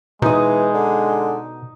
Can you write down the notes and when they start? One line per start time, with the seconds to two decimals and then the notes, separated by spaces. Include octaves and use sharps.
0.22 B2 E3 G#3 D#4 D#6
0.74 D3